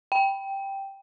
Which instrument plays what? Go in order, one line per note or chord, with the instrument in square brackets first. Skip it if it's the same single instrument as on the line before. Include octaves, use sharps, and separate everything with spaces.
[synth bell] G5